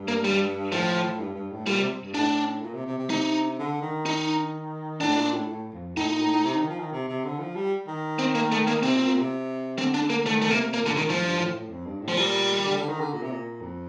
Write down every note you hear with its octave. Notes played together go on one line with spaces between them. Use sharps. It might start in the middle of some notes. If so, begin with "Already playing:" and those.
Already playing: G2
A#3
G3
A2 F3
G2
G2
A2
A#2 G3
C3
G2
A2 D4
A#2
C3
C3
C3
C3 D#4
D3
D#3
D#4
A2 D4
A#2
A2
A2
F2
A2 D#4
A#2
A2
A2
C3
D#3
F3
D#3
C3
C3
D3
F3
G3
D#3
C4
A#3
A3
A#3
C3 C4
A#2
A#2
C3
D3 C4
D4
D3
A#3
D#3 A3
A3
C3 A#3
A#2 A#3
D3
A#2
D#3
A2 F3
G2
A2
A2
F2
G2
A2
F3
A#2 G3
D3
D3
D#3
D3
A#2
C3
A#2
F2